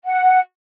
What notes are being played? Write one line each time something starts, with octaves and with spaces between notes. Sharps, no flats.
F#5